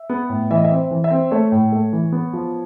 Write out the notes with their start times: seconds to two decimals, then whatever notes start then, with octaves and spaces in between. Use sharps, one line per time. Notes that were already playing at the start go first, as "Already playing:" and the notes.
Already playing: E5
0.10 B3
0.29 A2
0.51 E3 E5
0.57 D#5
0.65 E5
0.71 C4
0.91 E3
1.04 E5
1.11 C4
1.31 A3 C#5
1.52 A2
1.72 A3
1.93 E3
2.12 B3
2.33 F3